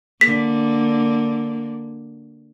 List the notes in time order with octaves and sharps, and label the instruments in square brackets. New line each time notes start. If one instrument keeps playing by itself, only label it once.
[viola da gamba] D3 A#3 [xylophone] B6